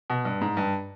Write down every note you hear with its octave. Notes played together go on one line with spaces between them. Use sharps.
B2
G2
G#2
G2